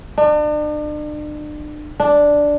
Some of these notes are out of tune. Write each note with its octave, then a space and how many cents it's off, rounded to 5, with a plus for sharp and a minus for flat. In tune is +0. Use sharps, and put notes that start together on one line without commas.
D4 +40
D4 +0